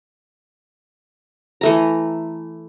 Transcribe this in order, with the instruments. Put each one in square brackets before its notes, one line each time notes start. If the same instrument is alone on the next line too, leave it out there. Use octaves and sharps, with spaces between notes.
[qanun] E3 A3 A#5